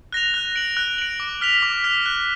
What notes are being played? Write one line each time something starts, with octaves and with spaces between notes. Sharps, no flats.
F#6 A#6 F7
F#6
D7 F#7
F#6
D7 F#7
D6
F6 B6 F7
D6
F6 B6 F7
F#6